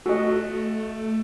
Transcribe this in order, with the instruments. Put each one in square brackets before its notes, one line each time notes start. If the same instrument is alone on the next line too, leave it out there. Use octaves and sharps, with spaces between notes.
[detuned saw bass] A3 [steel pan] F#4 D#5